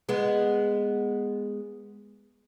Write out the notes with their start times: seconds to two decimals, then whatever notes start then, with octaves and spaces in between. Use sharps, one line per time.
0.09 G#3 B3